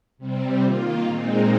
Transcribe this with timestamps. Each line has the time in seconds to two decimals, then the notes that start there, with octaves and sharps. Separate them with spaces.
0.18 C3 G3 C4
0.62 D#3 A#3 F4
1.05 A#2 G#3 C4 D#4